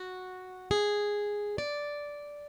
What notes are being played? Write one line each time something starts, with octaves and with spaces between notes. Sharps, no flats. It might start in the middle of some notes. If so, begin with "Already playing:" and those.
Already playing: F#4
G#4
D5